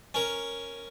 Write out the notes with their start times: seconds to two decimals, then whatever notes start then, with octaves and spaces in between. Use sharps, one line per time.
0.14 C#4 A#4